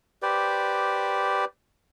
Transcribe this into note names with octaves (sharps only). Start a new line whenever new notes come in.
G4 B4 C5 D5